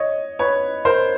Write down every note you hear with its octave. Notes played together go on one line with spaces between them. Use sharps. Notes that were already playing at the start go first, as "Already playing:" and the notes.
Already playing: C#5 D#5
B4 C#5
A#4 C5